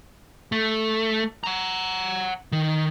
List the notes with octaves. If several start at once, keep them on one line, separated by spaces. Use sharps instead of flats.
A3
F#5 A#5
D#3